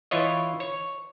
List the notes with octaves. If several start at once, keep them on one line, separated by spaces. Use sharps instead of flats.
E3 E4 F4 C#5 D#5
C#5